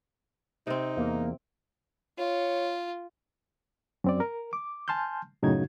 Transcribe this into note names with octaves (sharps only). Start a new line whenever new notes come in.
C3 C4 D#4
E2 A#3
F4 C#5
F#2 C4 D5
A#4
D6
G#5 A5 C6 F6 G6
F#2 A2 C#3 D#4 F#4 G#6